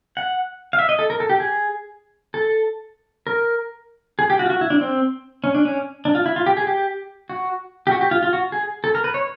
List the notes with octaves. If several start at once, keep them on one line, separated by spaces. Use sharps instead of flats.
F#5
F5
E5
D#5
A4
A#4
A4
G4
G#4
A4
A#4
G#4
G4
F#4
F4
F#4
E4
D4
C4
C#4
D4
C#4
D4
F4
E4
F4
G4
G#4
G4
F#4
G4
F#4
G4
F4
F4
F#4
G#4
A4
A#4
B4
C#5